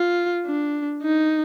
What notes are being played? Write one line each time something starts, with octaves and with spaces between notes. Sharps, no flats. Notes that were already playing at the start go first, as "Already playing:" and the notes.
Already playing: F4
D4
D#4